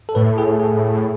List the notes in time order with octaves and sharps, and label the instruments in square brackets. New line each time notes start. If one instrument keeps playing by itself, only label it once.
[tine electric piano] A4
[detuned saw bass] A2 [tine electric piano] B4
[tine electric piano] A4
G#4
A4
G#4